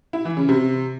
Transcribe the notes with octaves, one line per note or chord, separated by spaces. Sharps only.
E4
E3
C#3
C3